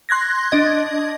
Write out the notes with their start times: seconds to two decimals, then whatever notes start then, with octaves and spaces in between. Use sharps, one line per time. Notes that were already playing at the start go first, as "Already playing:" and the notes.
0.09 C6 F#6 G#6 A#6
0.51 D4 D#5 G#6